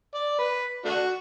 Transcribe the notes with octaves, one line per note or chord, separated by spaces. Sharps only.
D5
B4
A3 D4 F#4